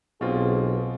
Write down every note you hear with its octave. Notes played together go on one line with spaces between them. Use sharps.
B1 B2 C4 F4 G#4